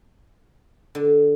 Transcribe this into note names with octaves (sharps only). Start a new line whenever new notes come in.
D3